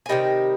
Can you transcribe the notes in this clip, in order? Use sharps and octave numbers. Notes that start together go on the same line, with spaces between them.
G#5
C3 D#3 G3 D#5 G5